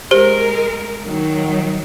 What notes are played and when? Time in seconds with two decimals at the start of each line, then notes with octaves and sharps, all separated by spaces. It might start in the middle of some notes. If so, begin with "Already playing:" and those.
0.11 G#3 G4 A#4 C5
1.05 D#3 F#3